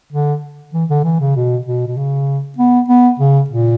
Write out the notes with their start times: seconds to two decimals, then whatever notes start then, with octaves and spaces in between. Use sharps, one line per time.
0.12 D3
0.74 E3
0.89 D3
1.04 E3
1.20 C#3
1.36 B2
1.65 B2
1.87 B2
1.97 C#3
2.58 B3
2.88 B3
3.19 C#3
3.50 A#2